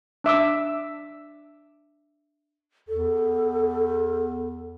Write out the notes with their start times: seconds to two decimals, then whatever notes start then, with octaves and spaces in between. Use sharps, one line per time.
0.24 D4 E5 D6 E6
2.88 E2 A4